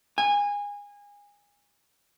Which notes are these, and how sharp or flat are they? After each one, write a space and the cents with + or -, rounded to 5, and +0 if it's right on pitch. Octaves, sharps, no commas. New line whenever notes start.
G#5 -25